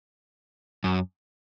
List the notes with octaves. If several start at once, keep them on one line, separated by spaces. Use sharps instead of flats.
F#2